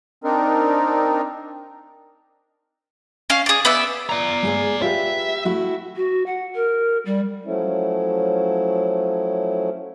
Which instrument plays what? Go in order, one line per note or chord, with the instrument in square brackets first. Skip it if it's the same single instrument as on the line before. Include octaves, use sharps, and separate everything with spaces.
[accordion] C4 D4 D#4 A#4
[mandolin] C#4 F5
G#4 D5
B3 D5 E5
[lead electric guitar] D5 A#5
[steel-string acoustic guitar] G#3 G#4 G#5
[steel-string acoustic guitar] F4 G4 B4 [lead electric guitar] E5
[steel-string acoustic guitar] A3 E4 F#4
[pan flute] F#4
F#5
A#4
G3
[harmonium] F3 F#3 A3 C#4 E4